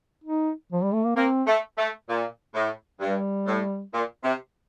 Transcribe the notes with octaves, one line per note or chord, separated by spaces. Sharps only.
D#4
F3
G3
A3
A#3
A#3 C4
A3
A3
A#2
A2
G2 G3
A2
A#2
C3